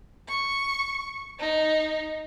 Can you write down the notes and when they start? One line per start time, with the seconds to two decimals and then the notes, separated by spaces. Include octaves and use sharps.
0.28 C#6
1.39 D#4